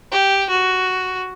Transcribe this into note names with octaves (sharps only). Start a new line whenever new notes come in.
G4
F#4